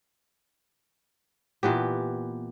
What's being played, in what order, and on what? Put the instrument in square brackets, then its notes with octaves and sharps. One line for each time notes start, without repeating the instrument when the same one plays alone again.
[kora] A#2 E3 B3 G4